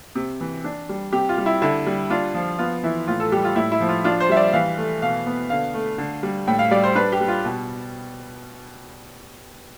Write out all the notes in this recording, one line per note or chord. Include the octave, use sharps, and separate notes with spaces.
C3
E3
D4
G3
C3 G4
F4
G3
E4
D3 E4
G3
D4 F4
F3
B3 F4
E3 E4
A2 F4
A4
G3 G4
F4
A2 E4
E4
F3
F4
D4 F4
C5
G3 E5
D5
E3 F5
A3
B2 F5
B3
D3 F5
A3
D3
G3
A2 G5
F5
G3 D5
C5
D4 B4
G4
G3
F4
B2